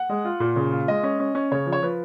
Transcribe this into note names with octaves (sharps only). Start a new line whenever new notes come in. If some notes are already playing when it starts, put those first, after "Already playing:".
Already playing: F#5
G#3
F4
A#2
C#3
F4
G#3 D#5
C#4
C#4
C#4
C#3 C#5
F3
C#5
F3 B4